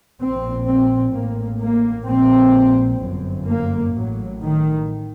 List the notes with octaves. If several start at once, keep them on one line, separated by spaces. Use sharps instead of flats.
A#1 A#2 C4
C4
A1 A2 A#3
A#3
A#1 A#2 C4
G1 F#2
A#3
A1 A2 F#3
D#3